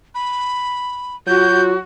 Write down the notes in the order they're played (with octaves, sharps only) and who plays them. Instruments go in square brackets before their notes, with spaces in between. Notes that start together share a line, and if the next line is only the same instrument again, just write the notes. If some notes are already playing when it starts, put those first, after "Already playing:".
[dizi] B5
[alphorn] F#3 [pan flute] F4 [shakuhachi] F#4 [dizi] G6